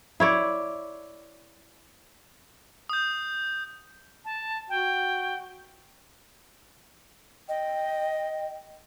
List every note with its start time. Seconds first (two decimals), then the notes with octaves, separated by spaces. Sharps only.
0.20 E4 C#5 D5
2.89 D#6 G6
4.25 A5
4.69 F#4 G5
7.49 D#5 G5